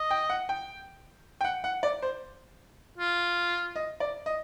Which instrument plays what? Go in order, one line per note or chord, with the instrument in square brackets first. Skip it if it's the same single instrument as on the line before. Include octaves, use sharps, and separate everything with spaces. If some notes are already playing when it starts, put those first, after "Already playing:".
Already playing: [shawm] D#5
[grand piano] G5
F#5
G5
G5
F#5
F#5
D5
C5
[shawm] F4
[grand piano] D#5
D5
D#5